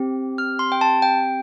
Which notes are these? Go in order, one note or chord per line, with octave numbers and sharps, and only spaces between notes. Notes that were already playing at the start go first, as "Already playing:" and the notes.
Already playing: C4 G4
F6
C6
G5
A5
G5